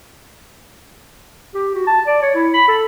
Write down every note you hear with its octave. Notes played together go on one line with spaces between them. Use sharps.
G4
F#4
A5
D5
C#5
E4
B5
A4